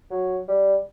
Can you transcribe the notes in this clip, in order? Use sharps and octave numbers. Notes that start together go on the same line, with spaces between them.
F#3
G3